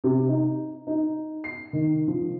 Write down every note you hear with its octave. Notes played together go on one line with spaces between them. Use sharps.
C3
D#4
D#4
C7
D#3
F3